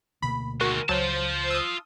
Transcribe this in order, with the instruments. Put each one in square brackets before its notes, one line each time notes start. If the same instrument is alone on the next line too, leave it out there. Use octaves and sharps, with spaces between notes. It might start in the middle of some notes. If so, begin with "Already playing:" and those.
[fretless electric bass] D2 B2 A#3 [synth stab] B5
[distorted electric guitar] D#3 G#3 [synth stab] F#4 [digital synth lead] A#4
[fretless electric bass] C#2 [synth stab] F#3 [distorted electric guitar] F4 A5 [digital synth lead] C5
[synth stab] D#6 E6